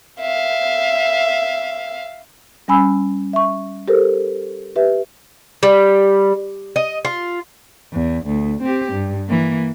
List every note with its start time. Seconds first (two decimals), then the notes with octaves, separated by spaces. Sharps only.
0.21 E5 F5
2.68 G3 C#4 G#5 B5 E6
3.33 E5 C#6
3.88 G4 A4 A#4 C5
4.76 G4 B4 E5
5.63 G3
6.76 D#5
7.05 F4
7.93 E2
8.26 D2
8.62 C4 G4
8.92 G2
9.27 E3 A#3